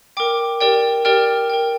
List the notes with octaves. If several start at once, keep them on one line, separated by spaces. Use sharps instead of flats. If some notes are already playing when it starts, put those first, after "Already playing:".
A#4 G5 D6
G4 A#4 D5 G5
G4 A#4 D5 G5 F6
A#4 G5